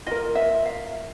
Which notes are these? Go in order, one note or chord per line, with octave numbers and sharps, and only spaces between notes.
F4 A#4 D#5
E5
F5